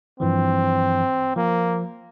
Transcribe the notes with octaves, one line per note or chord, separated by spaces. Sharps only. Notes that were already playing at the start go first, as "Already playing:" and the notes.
G2 E3 F3 C4
F3 A#3